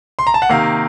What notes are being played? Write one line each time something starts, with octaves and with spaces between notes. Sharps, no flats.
C6
A#5
A5
F#5
C3 D#3 A#3 F5